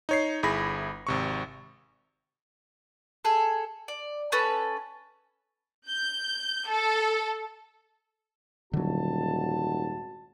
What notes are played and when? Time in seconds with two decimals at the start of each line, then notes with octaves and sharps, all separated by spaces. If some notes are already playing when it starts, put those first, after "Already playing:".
0.09 D#4 C#5 C7
0.43 G1 E4 G#4 B5 A#6
1.07 G#1 C3 C#6
3.25 G#4 A4
3.88 D5
4.32 C#4 A4 B4
5.88 G6
6.68 A4
8.73 D#1 G#1 D3 F#3 F#4 A5